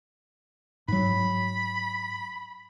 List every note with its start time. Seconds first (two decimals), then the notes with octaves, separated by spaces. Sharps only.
0.88 G#2 F#3 B5